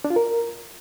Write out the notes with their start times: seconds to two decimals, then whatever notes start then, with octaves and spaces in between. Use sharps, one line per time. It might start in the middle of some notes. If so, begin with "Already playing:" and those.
0.04 D4
0.10 F4
0.16 A#4